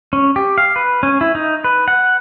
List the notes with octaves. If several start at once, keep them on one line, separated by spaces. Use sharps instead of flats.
C#4
G4
F5
B4
C#4
E4
D#4
B4
F#5